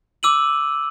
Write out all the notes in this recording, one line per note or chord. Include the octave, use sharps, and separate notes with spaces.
D6 E6 D#7 F#7